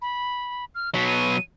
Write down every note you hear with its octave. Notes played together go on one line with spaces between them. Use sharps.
B5
F6
B2 F#3 B6
D#7